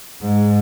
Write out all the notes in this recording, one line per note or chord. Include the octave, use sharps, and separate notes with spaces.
G#2